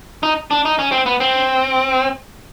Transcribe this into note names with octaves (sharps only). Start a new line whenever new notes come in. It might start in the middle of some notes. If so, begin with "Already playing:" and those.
D#4
D4
D#4
C#4
C4
B3
C4